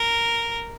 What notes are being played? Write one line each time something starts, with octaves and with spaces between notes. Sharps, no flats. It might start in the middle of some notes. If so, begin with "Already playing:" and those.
Already playing: A#4